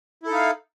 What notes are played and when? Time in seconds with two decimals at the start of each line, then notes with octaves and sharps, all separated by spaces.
0.23 E4
0.27 A4
0.30 D#4
0.34 F5